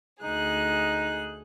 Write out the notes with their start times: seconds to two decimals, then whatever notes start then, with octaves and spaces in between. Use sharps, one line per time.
0.23 D2 D#4 G#4 F#6